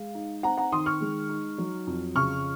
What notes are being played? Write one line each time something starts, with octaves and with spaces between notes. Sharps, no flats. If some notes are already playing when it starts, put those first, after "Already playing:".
Already playing: G#3 F5
D#4
C4 F#5 A#5
F#5 A#5
D#3 C6 D#6
C#6 F6
G#3
D#4
F#3
F2
C#3 C#6 F6